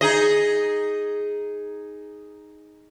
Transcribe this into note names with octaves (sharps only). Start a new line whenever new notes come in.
D#4 G#4 D#5